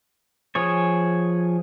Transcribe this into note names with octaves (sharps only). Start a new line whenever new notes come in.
F3 G#4 C#5